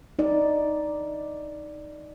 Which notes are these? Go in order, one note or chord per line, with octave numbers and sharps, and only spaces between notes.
D#4 D5